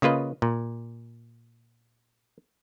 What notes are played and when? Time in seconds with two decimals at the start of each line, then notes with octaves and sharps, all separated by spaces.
0.02 C#3 A#3 F4 B4 D#5
0.42 A#2